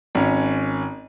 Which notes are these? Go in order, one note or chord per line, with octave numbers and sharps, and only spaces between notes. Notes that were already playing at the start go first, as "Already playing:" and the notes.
G#1 C#4